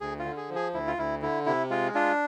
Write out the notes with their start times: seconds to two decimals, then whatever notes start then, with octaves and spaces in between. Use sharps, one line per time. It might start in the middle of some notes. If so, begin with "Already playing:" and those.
0.01 D2 G#4
0.19 F4
0.25 D3
0.37 G#4
0.49 F3
0.55 G#4
0.73 D2 E4
0.87 F4
0.98 D2 E4
1.22 D3 E4
1.46 C3 E4
1.70 G#3 F4
1.94 D4 F4